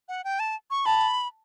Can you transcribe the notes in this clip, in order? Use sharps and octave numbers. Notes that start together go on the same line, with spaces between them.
F#5
G5
A5
C#6
A5 B5